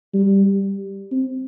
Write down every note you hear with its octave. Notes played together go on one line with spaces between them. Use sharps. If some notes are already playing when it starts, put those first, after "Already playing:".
G3
C4